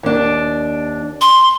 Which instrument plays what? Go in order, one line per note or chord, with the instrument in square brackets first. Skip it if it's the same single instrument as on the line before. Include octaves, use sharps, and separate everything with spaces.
[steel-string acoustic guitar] D#2 D4
[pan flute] C6